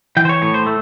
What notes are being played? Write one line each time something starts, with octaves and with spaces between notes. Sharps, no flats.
E3 G5
C5
C#5
A2 C#5
C5
A3